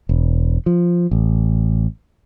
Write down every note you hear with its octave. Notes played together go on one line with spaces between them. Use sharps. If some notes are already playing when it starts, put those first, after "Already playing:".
E1
F3
A1